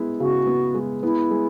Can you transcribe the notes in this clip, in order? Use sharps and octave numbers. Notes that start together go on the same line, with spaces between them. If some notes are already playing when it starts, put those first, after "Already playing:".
Already playing: G#3 B3 E4
C#3 F#4
B3
G#3
B3 E4
G#3